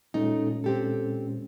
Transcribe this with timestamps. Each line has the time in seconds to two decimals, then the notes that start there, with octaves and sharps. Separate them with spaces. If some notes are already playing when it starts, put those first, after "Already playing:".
0.14 A#2 G#3 A3 C#4 D#4
0.64 C4 G4 A4